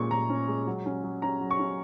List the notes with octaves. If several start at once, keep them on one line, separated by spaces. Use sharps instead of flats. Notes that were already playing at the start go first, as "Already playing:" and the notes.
Already playing: A#2 G#3 C#4 C#6
A#2 A#5
C#4
G#3
F#3
C#4
F#3
C#4 A#5
F#3
C#6
C#4